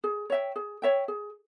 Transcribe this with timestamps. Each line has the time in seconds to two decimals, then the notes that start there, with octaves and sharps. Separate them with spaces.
0.04 G#4
0.30 C#5 E5 G5
0.56 G#4
0.82 C#5 E5 G5
1.08 G#4